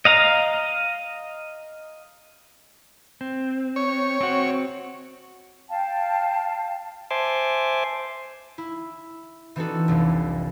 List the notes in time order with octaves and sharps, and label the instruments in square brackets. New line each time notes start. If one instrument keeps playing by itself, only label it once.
[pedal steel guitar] D#5 F5 A#5
[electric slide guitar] C4
[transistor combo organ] C#5
[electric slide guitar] C4 F#4
[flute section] F5 G5 A5
[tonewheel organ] C5 E5 G#5 A5 C6 D6
[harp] E4
E3 C4 D4 D#4 F#4 A4
F1 C2